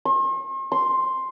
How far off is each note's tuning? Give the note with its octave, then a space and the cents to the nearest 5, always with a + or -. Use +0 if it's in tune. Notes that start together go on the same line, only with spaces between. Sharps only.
C6 +45
C6 +5